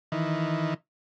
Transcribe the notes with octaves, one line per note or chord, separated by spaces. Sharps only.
D#3 E3